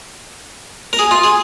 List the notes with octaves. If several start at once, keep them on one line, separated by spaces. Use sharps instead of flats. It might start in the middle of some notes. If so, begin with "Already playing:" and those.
A#4
G#4
F4
G#4